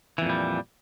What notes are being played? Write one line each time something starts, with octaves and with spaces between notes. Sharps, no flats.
F2 A#2 E3 G3